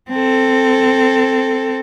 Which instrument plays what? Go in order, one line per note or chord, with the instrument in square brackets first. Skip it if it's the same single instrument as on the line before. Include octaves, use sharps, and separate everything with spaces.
[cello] C4 A4